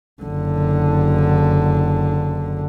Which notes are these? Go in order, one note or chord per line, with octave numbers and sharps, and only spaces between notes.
F#1 D3